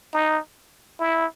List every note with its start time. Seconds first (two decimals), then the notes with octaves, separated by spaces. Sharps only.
0.13 D#4
1.00 E4